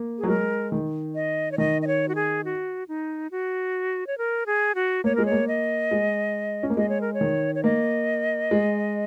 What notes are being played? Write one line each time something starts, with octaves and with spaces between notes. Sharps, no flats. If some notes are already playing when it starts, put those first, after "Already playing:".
Already playing: A#3
G#4
F#3
G#3 A#4
D#3
D#5
C#5
D#3 D#5
D#5
C#5
F#4
G#4
F#4
D#4
F#4
C#5
A#4
G#4
F#4
A#3 C#5
G#3 A#4
C#5
A#3
D#5
G#3
C#4
A#3
G#3 D#5
C#5
A#4
C#5
D#3
C#5
A#3 D#5
G#3